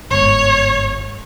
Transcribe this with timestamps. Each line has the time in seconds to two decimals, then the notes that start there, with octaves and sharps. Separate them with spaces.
0.11 G1 G#2 C#5